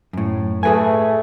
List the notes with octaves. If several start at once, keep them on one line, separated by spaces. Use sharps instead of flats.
F#2 A2
A3 G#4 B4 G#5